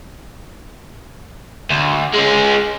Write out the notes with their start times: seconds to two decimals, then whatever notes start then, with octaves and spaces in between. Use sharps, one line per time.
1.70 D2
2.14 G#3 C#4